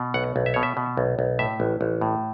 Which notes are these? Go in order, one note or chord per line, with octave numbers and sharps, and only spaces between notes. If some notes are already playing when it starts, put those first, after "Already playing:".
Already playing: B2
B1 F#5
B1
E5
B2 C#5
E5
B2
B1
B1
A2 E5
A1
A1
A2